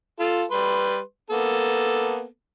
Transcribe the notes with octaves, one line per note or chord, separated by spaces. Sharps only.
F4 A4
G3 B4 C6
A#3 B3 A4